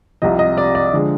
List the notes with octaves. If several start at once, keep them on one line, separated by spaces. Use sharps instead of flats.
C2 C3 F3 D#5
D#5
D5
D5
D3 F3 G#3